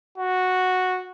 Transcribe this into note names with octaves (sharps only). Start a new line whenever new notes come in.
F#4